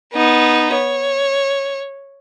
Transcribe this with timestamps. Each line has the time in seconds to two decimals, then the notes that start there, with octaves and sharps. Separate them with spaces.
0.14 B3 D#4
0.74 C#5